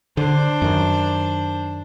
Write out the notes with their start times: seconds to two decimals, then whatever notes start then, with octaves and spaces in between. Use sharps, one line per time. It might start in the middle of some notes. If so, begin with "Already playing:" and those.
0.17 D3 D4 C5
0.62 F#2 D#3